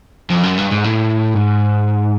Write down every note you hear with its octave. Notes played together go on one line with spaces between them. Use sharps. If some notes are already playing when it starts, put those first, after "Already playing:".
F2
F#2
G2
G#2
A2
G#2